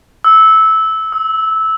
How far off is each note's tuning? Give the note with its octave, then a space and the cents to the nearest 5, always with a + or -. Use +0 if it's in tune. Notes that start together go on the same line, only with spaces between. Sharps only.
E6 -15
E6 -45